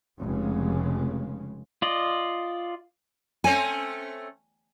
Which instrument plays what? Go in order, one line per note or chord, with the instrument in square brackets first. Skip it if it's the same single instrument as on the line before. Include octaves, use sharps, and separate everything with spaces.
[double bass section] F1 C#3 G#3
[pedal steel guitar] F4 D5 D#5
[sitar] A3 C4 C#4 [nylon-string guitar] G#5